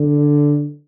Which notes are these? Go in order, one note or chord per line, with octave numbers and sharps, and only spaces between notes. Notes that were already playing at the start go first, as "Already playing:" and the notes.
Already playing: D3